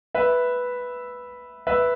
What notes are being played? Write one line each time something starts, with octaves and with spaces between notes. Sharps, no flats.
B4 E5
B4 E5